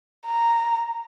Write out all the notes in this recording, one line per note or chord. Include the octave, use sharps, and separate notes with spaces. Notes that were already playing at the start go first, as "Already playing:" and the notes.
A#5